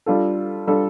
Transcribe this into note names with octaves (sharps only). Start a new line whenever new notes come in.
G3 D4 F4 A4
G3 D4 F4 A4